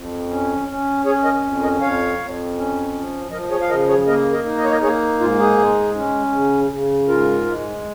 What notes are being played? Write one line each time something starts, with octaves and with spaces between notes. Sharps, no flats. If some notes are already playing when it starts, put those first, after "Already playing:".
Already playing: F2
C#4
C#4
C#4 G#4 C#5
A#4 D#5
F2
A#4 D#5
F2 C#5 F5
F2
C#4
F3
F3 A#4 D#5
G#4 C#5
F5
C#3 A#4 D#5
G#4 C#5
A#3 A#4 D#5
A#4 D#5
D#4
D#5
C#5
A#4 D#5
A#3 G#4 C#5
G#2 F4
D#4 G#4
G#3
C#4
C#3
C#3
G#2 F4 A#4
G#3